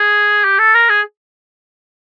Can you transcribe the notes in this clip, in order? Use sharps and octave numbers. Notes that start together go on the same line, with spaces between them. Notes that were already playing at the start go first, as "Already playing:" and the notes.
Already playing: G#4
G4
A4
A#4
G#4